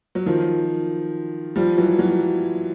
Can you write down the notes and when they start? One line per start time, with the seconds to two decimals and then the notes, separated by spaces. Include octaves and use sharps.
0.15 F#3
0.26 D#3 F3
1.56 F3 G3
1.77 E3 F#3
1.99 E3 F#3